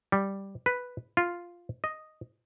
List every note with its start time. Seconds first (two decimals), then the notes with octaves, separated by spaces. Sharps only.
0.12 G3
0.66 B4
1.17 F4
1.84 D#5